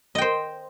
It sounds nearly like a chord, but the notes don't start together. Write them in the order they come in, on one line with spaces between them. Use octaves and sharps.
D#5 G5 C5